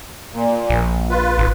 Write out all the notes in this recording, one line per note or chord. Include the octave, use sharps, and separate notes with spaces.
A#2
A#1
F4 B4
G#1